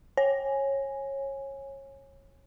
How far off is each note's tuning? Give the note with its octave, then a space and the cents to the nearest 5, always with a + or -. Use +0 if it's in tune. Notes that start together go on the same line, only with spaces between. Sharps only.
C#5 -20 G#5 +0